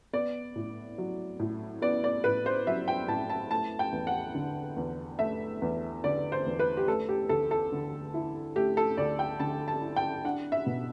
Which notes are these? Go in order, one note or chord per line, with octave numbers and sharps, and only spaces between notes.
B3 D5
A2
F#3
A2
B3 D5
D5
A2 B4
C5
F#3 E5
G5
A2 A5
A5
A3 A5
G5
E2
F#5
D3
E2
A3 E5
E2
D3 D5
C5
E2
B4
G4
A3 A4
G4
D2 A4
A4
D3
E4
A3 G4
A4
D2 D5
G5
D3 A5
A5
E4
G5
D4 F#5
E5
B2